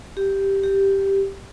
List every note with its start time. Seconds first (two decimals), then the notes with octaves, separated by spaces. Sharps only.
0.17 G4
0.63 G4